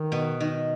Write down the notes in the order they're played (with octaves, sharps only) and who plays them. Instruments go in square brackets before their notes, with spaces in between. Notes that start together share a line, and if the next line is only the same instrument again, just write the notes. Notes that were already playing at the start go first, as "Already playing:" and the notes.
Already playing: [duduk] D#3
[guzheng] B2
D#3